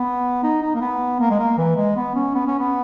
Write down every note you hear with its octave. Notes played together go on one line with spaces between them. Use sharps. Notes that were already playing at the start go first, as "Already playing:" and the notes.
Already playing: B3
D#4
D#4
A#3
B3
A#3
G#3
A#3
E3
G#3
B3
C#4
B3
C#4
B3